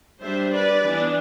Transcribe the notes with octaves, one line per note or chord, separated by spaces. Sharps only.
G3 D4 C5 E5
B4 D5
E3 B3 D4